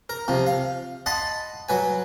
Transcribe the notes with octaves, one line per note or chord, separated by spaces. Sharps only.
A#4
C3 F3
F5
D#5 F#5 A5 B5 C6
F#3 B4 G#5